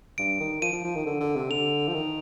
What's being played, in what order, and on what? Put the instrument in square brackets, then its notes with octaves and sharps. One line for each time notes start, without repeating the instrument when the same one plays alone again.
[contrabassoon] G2 [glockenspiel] D7
[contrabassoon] D#3
[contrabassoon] F3 [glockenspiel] D#7
[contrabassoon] F3
F3
D#3
D3
D3
C3
[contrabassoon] D3 [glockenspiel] F7
[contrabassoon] F3
D#3